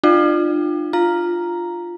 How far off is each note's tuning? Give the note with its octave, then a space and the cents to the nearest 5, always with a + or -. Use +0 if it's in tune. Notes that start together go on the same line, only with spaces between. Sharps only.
D4 +40 F4 +0 G5 +0
F4 +0 A#5 +0